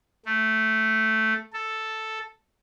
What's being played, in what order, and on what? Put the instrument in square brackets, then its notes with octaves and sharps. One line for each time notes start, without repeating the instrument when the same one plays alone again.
[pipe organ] A3
A4